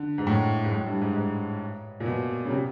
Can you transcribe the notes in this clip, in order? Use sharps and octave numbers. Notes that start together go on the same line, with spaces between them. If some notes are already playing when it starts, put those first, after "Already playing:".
Already playing: D3
G#2
A2
G#2
A2
G2
G#2
G#2
A#2
B2
C#3
C3